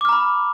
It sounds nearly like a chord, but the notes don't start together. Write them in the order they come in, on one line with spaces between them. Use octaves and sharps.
D6 F6 A#5 B5